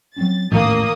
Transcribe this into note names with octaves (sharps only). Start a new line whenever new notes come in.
F#3 C4 C#4 A6
A1 E2 G#2 D#3 A#3 D#6